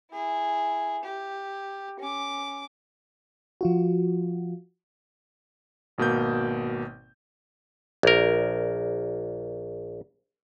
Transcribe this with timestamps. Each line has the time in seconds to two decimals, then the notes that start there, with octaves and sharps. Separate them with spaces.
0.11 E4 G#4
1.04 G4
2.00 C#4 D6
3.61 F3 F4 F#4
5.98 G#1 B2 A#3 G6
8.03 A#1 A#4